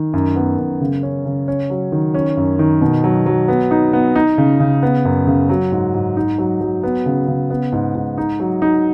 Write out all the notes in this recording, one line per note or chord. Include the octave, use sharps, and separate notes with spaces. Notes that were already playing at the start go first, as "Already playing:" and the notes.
Already playing: D#3
F#2
B3
F#2
C#3
C#4
C#3
C#4
F#3
D#3
C#4
F#2
D#3
B2
F#3
F#3
B3
D#4
B3
D#4
C#3
C#3
B3
F#2
C#3
F#3
G#2
G#2
D#4
F#3
F#3
B3
C#3
C#3
B3
G#2
G#2
D#4
F#3
D#4